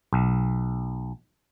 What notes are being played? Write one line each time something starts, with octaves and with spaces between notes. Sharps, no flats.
B1